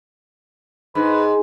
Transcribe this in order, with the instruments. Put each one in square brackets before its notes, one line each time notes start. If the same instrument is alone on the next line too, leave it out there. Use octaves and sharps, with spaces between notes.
[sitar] G#2 [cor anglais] B4